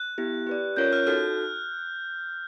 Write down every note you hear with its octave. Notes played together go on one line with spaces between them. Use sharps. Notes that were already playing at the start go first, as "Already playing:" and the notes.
Already playing: F#6
B3 E4 G4
G4 B4 D5
C#4 F4 A#4 C#5 G6
F6
D#4 F#4 A4 F6